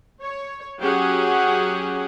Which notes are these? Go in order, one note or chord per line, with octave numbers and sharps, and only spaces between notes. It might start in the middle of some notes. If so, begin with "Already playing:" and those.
C#5
F#3 C#4 G4 G#4 F#5